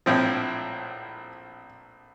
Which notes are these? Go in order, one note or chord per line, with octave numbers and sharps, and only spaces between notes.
A#1 A2 F3 C4